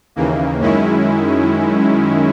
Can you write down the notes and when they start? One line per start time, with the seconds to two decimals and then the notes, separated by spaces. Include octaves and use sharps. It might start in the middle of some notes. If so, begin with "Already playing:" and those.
0.16 D#2 C#3 E3 A#3
0.61 F#2 D#3 G#3 C#4 E4